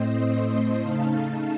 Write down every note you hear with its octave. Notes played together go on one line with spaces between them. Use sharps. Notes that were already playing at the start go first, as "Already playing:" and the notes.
Already playing: A2 A3 C4 C5 D#5
C#3 A3 D#4 F5 A5